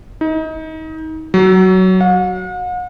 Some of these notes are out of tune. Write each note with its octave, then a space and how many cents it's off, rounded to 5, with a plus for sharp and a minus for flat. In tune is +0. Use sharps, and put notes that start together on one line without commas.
D#4 +30
F#3 +15
F#5 -45